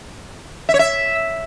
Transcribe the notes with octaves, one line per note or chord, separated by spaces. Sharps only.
E5
C#5
E5